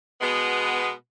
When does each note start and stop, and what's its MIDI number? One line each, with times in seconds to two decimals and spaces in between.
0.21 0.90 47
0.21 0.90 56
0.21 0.90 59